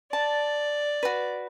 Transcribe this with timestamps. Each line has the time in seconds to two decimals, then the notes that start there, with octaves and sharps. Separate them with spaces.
0.13 D5 A5
1.03 F#4 B4